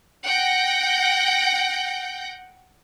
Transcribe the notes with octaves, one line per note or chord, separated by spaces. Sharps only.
F#5 G5 G6 A#6